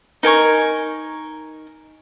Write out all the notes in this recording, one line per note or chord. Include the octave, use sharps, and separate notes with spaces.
D#4 A#4 G#5 C#6